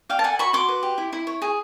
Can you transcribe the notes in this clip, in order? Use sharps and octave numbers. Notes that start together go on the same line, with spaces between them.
D5 F5 G5
A5
A4 F#5 G#5
F#4 B5 C#6
F#4 C6 D6
B4
G4
E4
E4
C#5
G#4